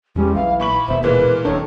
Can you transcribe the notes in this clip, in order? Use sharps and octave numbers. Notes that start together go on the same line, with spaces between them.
E2 G3 G#3 C#4
B1 E3 F5
A#2 B5 C#6 F#7
D#1 B2 C5 E5
A#2 E3 G#3 A#4 B4
D1 D#3 D4 A4 C#5